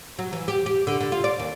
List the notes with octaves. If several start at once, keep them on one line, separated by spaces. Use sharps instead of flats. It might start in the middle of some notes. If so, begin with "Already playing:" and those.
F#3
E3
G4
G4
D3
D3
F4
D5
D#2